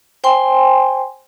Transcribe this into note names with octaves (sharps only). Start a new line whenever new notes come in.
C5 G5 G#5 C6